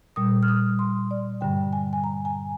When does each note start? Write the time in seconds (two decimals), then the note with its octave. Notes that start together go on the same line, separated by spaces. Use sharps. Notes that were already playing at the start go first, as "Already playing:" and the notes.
0.16 A#2 G3 D#6
0.43 F6
0.48 D#6
0.79 C6
1.11 D5
1.41 G2 D3 G3 G5
1.73 G#5
1.93 G#5
2.04 A#5
2.25 G#5